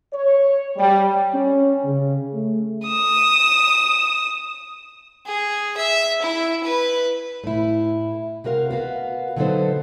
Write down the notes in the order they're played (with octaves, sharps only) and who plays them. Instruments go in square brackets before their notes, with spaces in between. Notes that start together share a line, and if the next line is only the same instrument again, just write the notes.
[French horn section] C#5
G3
[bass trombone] C#4
C#3
A3
[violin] D#6 E7
[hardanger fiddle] G#4
E5
E4
B4
[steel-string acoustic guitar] A2 E4
C3 F#4 A#4 F5
B3 F#4 F5
D3 F#3 B3 D#4 A4 C5